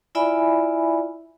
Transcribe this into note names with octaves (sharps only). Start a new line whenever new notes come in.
E4 F4 D5 E5 G#5 B5